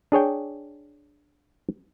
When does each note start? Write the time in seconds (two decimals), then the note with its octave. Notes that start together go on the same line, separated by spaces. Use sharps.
0.12 D4 G#4 C#5 G5